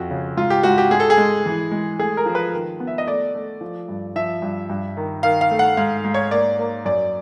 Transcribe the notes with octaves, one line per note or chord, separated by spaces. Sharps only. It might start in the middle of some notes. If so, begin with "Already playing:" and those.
Already playing: F2 F#4
C#3
G#2 F4
G4
G#2 F#4
G4
G#3 G#4
A4
G#4
G#3
E3
G#3
A3 G#4
A#4
F3
B4
D#3
B3
E5
D#5
A3 D5
A3
F3
G2
F3 E5
G2
G2
D#3
D#3 F5
F5
A3
F#5
G#2 F5
G#2
C#5
A#3 D5
A#3
F#2 D5